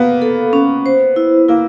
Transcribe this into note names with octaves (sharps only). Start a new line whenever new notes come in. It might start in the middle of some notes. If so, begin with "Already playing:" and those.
Already playing: A#3 B3
A4
C#4
C5
E4
A#3 E4